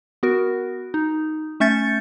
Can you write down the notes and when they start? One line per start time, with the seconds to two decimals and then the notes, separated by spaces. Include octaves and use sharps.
0.23 B3 F#4 A#4
0.94 D#4
1.60 A3 C#4 E5 G6 A6 C#7